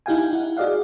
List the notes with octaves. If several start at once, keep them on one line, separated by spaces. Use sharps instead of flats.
D#4 E4 G4 F5 G5 G#5
E4 F#5
F#4 G#4 D5 D#5 F5 F#5